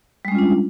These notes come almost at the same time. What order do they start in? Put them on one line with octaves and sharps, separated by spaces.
G3 G#3 C#4 F4 D4